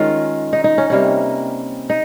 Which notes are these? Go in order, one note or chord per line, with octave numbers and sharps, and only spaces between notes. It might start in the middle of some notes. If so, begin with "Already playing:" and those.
Already playing: D#3 G#3 C#4 F4
D#4
D#4
C#4
C3 G3 A#3 C#4
D#4